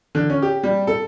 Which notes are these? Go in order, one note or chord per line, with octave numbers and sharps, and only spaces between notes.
D3
C#4
G4
G3
A4